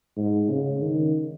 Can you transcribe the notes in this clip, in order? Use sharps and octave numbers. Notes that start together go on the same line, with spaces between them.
G#2
C#3
D#3